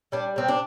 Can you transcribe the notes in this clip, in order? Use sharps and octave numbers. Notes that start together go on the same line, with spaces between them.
G3 D4
C3 C4
D4